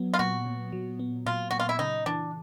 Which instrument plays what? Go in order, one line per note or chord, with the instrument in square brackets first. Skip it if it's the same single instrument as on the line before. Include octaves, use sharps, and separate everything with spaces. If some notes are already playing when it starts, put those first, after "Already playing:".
Already playing: [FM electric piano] F#3 B3
[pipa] F4
[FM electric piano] A#2 [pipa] F#4
[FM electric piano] A#2
F#3
B3
[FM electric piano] A#2 [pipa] F4
[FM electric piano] A#2 [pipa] F#4
[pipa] F4
E4
[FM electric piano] C#3 [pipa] D#4
[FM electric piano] E3 [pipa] D4